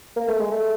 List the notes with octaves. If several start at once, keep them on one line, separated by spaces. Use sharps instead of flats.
A#3
A3
G#3
A3